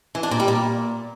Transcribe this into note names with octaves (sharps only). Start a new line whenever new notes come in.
E3
D4
A#2
G3
A#2